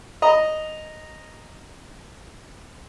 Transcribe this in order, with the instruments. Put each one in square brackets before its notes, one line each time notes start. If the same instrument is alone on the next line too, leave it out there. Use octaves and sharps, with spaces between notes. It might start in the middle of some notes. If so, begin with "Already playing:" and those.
[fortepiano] D#5 A#5